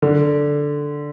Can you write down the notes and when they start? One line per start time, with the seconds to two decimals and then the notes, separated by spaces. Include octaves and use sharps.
0.02 D3